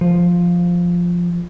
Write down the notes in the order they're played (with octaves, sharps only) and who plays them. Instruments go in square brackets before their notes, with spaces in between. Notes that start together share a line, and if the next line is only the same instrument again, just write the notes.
[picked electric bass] F3